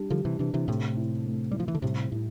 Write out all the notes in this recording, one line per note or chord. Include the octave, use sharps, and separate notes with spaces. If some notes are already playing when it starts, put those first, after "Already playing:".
Already playing: G3 D4
D3 F3 G3
C3 E3
C3 E3 D4
C3 E3
A2 C3 A3
E4
A3
G3 E4
F3
E3
D3
A2 C3 G3
A2 E4